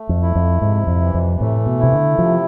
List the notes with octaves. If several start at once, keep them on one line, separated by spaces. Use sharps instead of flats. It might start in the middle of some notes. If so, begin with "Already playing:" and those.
Already playing: A3
F2
E4
F2
G#2 C3
F2
E3
F2
A2 A3
B2
C3 E4
D3
C3 F3